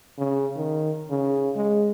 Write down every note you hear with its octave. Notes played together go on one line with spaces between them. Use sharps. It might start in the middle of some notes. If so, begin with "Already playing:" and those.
C#3
D#3
C#3
G#3